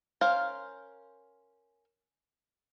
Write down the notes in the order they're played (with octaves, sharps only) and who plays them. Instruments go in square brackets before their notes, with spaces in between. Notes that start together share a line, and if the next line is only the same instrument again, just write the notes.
[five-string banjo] C#4 A#4 C5 F5